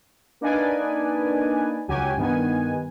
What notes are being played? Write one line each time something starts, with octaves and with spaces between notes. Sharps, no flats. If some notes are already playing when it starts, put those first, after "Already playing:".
A#3 D4 D#4 B4 D5 G#5
C#2 F#3 F#4 G4 G#5
G2 D#3 B3 G#5